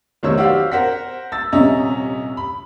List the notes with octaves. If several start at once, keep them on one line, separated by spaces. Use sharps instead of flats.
F1 D#3 F#3 C5 C#5 E6
F#4 G4 C5 D5 F5 E6
A#4 C5 F#5 B6
E6 A6
D#1 C3 C#4 D#5 E5 A#5
B5